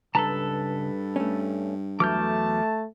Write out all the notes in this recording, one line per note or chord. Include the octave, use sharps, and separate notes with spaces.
C#2 G2 A4 B4 A5 A#5
A3 C#4
E2 F#3 A3 A5 D6 F6 G6